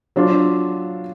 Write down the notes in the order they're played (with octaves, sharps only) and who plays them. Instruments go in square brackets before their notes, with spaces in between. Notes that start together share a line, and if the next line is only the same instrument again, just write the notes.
[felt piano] F#3 D4 F4